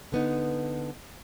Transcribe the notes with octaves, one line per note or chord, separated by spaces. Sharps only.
D3 B3 D#4